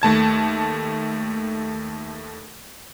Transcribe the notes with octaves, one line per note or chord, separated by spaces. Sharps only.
D#2 A3 A5 G#6